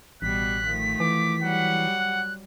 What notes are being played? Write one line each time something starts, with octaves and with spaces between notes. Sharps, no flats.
A1 B2 G3 F#6 B6
D#3 F3 A3
E3 D6
F#3 G3 F#5
F#6